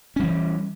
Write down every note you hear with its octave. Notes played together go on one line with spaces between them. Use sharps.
E3 G3 C#4